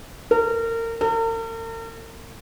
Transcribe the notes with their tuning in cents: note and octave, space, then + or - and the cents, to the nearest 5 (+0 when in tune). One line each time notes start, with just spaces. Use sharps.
A#4 -30
A#4 -45